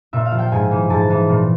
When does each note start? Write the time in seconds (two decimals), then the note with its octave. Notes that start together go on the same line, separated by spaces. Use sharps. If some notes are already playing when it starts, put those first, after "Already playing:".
0.13 A#2 E5
0.25 F5
0.32 F3
0.39 G5
0.52 G#2 G#5
0.71 E3
0.90 G#2 A5
1.10 E3
1.29 A#2